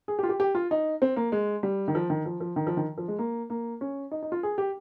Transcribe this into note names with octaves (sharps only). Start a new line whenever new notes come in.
G#4
G4
F4
G4
G4
F4
D#4
C4
A#3
G#3
G3
D#3
F3
D#3
F3
F3
D#3
F3
D#3
F3
G#3
A#3
A#3
C#4
D#4
D#4
F4
G#4
G4